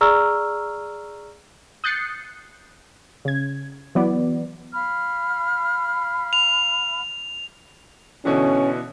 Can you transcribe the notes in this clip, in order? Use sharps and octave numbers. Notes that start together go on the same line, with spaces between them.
G#4 D5 A#5 C#6 E6 F6
D#6 F#6 G6 A6 C7 C#7
C#3 G#6
E3 F#3 B3 D5
F5 B5 F6
F7
B2 D3 E3 C#4